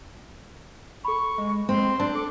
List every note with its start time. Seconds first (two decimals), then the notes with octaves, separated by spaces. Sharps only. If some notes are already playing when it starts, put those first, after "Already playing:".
1.05 A4 B5 C#6
1.38 G#3
1.69 G#3 C4 C6
2.00 C4 D4
2.15 A4 D6